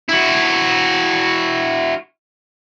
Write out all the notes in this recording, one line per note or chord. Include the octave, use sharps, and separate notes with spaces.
E4 F#4